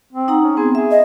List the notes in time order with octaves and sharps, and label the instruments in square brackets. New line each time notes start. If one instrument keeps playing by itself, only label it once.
[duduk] C4
[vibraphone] D#4 F#5 A#5
[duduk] C#4
[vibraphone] B3 C4 [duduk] G#4
[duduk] G#4 [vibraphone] E5
[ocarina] D#5